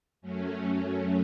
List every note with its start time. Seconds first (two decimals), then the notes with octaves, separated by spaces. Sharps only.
0.22 F#2 F#3 A3 C#4
0.65 C#4